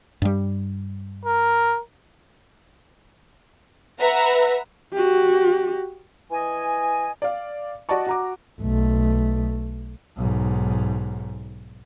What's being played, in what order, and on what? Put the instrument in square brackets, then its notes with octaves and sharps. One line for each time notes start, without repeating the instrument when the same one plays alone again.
[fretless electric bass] G2 G3
[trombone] A#4
[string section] B4 E5 F#5 A#5
[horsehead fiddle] F#4 G4
[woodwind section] E3 D#5 G#5
[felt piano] D5 F5
F#4 D5 D#5 A5 C#6
F#4 A#5 D6
[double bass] B1 A3
B1 G#2